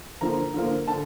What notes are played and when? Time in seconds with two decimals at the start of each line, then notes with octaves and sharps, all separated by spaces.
0.21 D3 F3 A#3 A#5
0.54 D3 F3 A#3
0.88 D3 A5